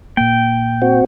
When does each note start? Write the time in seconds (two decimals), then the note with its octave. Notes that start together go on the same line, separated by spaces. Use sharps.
0.17 A#2 A#3 G5
0.82 C4 F#4